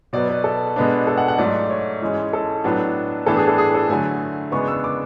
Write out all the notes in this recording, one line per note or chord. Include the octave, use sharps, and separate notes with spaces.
B2 F#3 B3 D5
B4
A4
B2 G#3 B3 D4
A4
F#5
F#5
G#2 F#3 A3 D5
C#5
G#2 E3 G#3 C#4
A4
A2 F#3 B3 D4
A2 E3 B3 D4 A4
G#4
A4
G#4
A4
D3 F#3 A3 G#5
E2 C#3 G#3 B3 D4 C#6
E6
D6